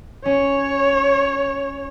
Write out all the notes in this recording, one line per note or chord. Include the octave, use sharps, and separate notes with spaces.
C#4 C#5